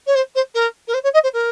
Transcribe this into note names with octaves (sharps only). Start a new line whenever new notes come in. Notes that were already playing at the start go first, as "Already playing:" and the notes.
C#5
C5
C5
A#4
A#4
C5
C#5
D#5
C5
A#4